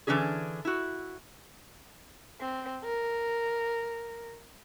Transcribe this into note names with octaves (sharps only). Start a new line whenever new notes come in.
D3 E3 C#4 D4 G4 G#4
E4 F#4
C4
A#4